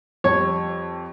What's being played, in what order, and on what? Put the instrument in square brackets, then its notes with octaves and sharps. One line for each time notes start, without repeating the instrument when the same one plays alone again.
[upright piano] F2 G3 [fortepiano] C#5